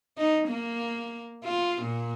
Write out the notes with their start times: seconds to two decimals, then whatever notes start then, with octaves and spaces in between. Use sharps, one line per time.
0.18 D#4
0.48 A#3
1.44 F4
1.82 A#2